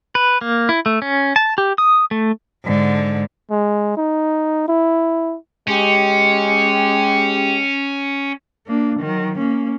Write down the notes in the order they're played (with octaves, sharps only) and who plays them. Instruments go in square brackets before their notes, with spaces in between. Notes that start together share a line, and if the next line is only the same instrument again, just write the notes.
[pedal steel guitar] B4
A#3
E4
A3
C#4
A5
G4
D#6
A3
[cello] G#2 D3
[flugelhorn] G#3
D#4
E4
[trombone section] G#3 G4 [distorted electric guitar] C#4
[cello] A#3 D4
D#3 F#3
A#3 C#4